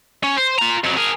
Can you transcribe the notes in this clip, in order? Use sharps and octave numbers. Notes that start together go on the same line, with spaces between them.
C#4
C5
F4 A#5
F2 F#3
G#4 A#4